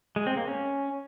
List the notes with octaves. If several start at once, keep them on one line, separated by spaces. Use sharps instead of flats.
G#3
C4
A#3
C#4